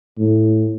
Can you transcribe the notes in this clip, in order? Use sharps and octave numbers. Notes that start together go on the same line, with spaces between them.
A2